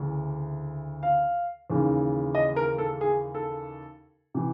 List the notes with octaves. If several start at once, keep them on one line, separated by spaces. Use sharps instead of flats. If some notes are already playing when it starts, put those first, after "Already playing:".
Already playing: D2 C#3 E3
F5
D#2 C#3 E3
D#5
A#4
A4
G#4
A4
C3 E3